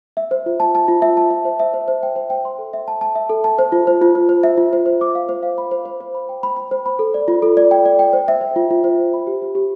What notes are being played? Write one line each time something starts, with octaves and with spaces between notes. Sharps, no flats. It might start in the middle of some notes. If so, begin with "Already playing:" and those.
E5
C5
F4
A5
A5
F4
E5
A5
E5
C5
E5
C5
C5
G5
C5
G5
C6
A4
E5
A5
A5
E5
A4
A5
C5
F4
C5
F4
C5
C5
E5
F4
C5
C5
D6
F5
C5
F5
B5
C5
C5
C5
B5
G5
B5
B5
C5
B5
A4
D5
F4
A4
D5
G5
D5
G5
C5
E5
C5
F4
F4
C5
E5
B5
G4
G4
G4